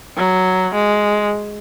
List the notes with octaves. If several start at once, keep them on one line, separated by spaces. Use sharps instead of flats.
F#3
G#3